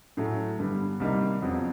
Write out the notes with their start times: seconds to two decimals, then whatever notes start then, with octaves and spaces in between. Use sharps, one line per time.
0.17 A2 F#3 A3 C#4
0.59 G2 D3 G3 B3
1.00 C2 C3 D#3 G3 A#3
1.42 F2 C#3 F#3 B3